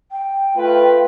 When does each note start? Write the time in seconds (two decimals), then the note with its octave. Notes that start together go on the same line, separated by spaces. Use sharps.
0.11 G5
0.56 A3 F4 B4